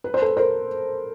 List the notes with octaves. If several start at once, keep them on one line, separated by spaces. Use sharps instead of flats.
B4
C5
A4 B4
A#4 C5